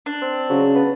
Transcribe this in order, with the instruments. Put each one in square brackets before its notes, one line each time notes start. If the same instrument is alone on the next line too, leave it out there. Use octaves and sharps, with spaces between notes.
[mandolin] D4
[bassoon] C4
[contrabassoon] C#3 [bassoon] F#3
[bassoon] B3